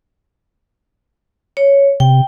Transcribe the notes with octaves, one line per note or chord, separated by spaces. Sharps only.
C#5
C3 G5